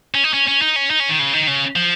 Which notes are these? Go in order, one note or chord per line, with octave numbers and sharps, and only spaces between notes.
C#4
D#4
C#4
C#4
D#4
C#4
D#4
C#4
D#3
C#3
D#3
C#3
F3